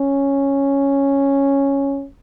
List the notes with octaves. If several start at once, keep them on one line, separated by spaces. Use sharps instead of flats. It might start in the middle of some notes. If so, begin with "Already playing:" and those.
Already playing: C#4